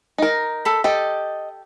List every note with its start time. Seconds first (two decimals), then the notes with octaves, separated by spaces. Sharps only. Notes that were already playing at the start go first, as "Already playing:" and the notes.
0.18 D#4 A#4
0.65 A4 B5
0.84 G4 A4 D#5